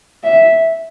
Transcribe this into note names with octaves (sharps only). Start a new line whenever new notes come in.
E5